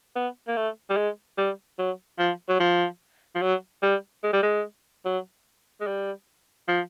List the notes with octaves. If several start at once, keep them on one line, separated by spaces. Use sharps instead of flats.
B3
A#3
A3
G3
G#3
G3
F#3
F3
F#3
F3
F3
F#3
G3
G#3
G3
G#3
F#3
G#3
G3
F3